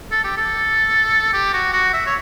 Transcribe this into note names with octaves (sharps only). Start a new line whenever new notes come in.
A4
G4
A4
G4
F#4
F#4
E5
C#5